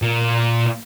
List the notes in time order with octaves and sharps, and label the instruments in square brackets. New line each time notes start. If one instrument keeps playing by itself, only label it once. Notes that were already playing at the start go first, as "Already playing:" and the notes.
[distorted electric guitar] A#2